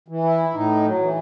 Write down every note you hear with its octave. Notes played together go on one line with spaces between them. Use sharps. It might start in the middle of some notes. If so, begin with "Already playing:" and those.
E3
E4
A2 D#4
F#3
E3